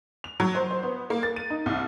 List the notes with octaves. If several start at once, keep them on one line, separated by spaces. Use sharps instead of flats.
F7
F#3
C5
C5
B3
A#3
A6
D#7
D#4
C2